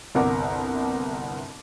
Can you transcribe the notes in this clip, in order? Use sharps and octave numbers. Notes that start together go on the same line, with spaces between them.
G1 C2 A#4 F#5 D6